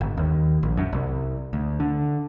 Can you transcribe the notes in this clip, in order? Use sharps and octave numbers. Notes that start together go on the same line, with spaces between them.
G1
D#2
A#1
F#2
C2
D2
D3